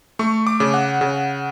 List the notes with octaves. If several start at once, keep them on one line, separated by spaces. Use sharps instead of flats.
A3 C#6
D6
C#3
F#5
C#3